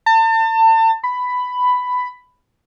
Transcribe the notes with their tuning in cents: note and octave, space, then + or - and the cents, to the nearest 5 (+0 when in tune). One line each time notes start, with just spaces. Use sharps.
A5 +35
B5 +10